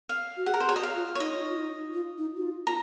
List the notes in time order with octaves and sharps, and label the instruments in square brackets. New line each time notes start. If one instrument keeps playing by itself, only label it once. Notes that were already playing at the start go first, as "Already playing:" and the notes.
[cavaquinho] F5
[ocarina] F#4
[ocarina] G#4 [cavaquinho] F#5
[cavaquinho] A#4
C5
[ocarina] G#4
[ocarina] F#4 [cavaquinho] C#5
[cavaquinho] D#5
F5
[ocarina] F4
[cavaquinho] C#5
[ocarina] D#4 [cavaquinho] D#5
[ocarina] F4
D#4
F4
D#4
F#4
F4
[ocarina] F4 [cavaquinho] A#5